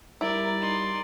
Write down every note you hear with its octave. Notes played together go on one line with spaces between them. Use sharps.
G3 E4 A#4 D5
D#4 C6